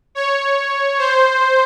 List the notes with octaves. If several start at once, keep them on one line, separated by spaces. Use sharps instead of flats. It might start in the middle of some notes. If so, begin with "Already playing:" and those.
C#5
C5